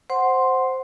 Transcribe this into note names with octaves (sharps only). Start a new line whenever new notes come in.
C5 F#5 C6